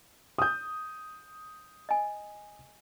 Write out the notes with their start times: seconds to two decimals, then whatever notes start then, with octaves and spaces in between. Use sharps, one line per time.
0.38 D#6 G6
1.89 D#5 G#5